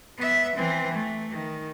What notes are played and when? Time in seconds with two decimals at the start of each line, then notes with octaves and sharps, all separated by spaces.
0.18 B3 E5
0.56 E3 C4
0.94 A3
1.31 D#3